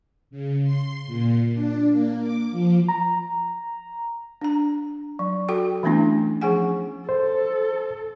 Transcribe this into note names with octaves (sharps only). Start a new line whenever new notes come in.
C#3
C6
A#2
D4
A#3
D6
F3
A#5
D4 A#5
F#3
F#4 A4 G5
E3 A3 B3 C#4 D4 E4
F3 C#4 G#4 F#5 G#5
A4 C5